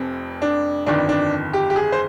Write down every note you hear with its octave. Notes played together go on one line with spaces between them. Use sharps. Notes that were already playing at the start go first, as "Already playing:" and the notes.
Already playing: F1 F2 C4
D4
G1 F2 D#3 D4
D4
G4
G4
G#4
C5